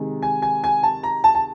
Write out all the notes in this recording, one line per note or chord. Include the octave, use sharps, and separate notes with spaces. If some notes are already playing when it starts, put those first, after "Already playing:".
Already playing: C3 D#3 G#3
G#5
G#5
G#5
A5
A#5
A5
A5